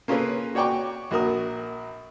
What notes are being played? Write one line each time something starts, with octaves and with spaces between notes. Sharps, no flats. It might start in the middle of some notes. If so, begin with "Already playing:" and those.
A#3 C#4 F4 G#4 A4 B4
F#4 C#5 D5 G5 C#6 D6
A#1 F#4 A#4 D#6